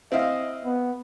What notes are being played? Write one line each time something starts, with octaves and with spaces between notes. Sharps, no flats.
C4 E4 D#5 F5
B3